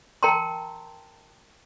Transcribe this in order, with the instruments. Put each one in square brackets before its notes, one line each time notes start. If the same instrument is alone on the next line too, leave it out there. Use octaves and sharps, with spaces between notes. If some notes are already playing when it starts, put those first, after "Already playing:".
[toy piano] A#4 G5 A5 A#5 C6